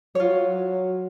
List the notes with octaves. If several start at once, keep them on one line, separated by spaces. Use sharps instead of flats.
F#3 F4 C#5